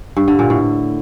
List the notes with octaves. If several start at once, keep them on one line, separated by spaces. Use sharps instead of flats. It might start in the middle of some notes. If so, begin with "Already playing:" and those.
G2
D3
A#2
A2